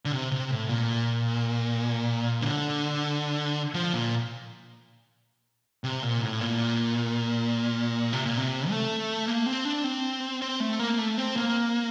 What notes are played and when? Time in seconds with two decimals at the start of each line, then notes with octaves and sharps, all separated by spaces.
0.05 D3
0.12 C3
0.31 C3
0.51 A2
0.69 A#2
2.41 D3
3.74 F3
3.93 A#2
5.84 C3
6.03 A#2
6.22 A2
6.41 A#2
8.13 C3
8.25 A#2
8.37 C3
8.70 A3
9.27 A#3
9.46 C4
9.65 D4
9.84 C4
10.42 C4
10.60 A3
10.79 A#3
10.99 A3
11.18 C4
11.36 A#3